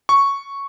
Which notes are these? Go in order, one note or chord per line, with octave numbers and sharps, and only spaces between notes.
C#6